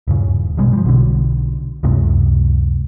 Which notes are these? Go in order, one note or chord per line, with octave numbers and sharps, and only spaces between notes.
D#1 G2 C#3
A#1 B2 G3 G#3
F3 G3
B1 B2 D3
C#2 F#2 C3 G#3